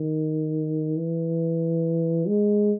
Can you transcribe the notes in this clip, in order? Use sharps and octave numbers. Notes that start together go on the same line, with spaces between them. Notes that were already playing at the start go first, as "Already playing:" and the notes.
Already playing: D#3
E3
G#3